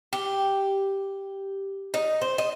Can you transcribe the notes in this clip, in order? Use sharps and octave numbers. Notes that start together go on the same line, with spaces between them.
G4
D#4
C5
D#5